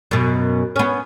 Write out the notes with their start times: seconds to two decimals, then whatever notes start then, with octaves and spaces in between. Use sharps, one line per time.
0.11 F#2 B2
0.76 B3 C#4